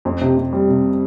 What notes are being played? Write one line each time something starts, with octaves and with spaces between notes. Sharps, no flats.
F2
C3
C3
G3
C3